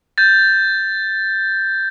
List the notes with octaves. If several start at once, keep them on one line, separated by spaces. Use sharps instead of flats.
G6 A6